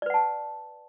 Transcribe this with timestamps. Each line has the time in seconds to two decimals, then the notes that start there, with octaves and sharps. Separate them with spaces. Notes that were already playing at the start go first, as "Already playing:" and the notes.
0.02 D5
0.06 B4
0.10 F#5
0.14 A5